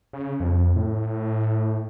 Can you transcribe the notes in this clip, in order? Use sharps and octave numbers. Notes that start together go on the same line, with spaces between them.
C#3
F2
A2